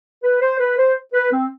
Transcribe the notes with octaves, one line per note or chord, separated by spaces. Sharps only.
B4
C5
B4
C5
B4
C4